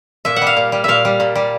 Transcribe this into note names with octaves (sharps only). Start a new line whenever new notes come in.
A#2 E5
F#5
G3 F5
A#2
G3
A#2 E5 F5
G3
A#2
G3